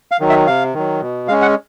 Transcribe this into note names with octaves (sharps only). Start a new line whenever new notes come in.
F5
D#3 F#3
E5
C3 F5
D#3 F#3
B2
G#3 C#4 F5
F#5